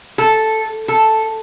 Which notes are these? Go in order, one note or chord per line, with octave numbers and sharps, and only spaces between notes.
A4
A4